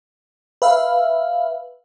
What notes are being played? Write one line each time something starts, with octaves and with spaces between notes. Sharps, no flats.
B4 E5 F5